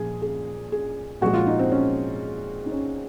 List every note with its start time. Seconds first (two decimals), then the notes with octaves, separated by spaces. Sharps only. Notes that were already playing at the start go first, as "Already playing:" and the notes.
Already playing: A#2 F3 G#4
0.22 G#4
0.72 G#4
1.21 A#2 F3 G#3 F#4
1.34 F4
1.47 D#4
1.59 C4
1.72 C#4
2.66 D#4
2.72 C#4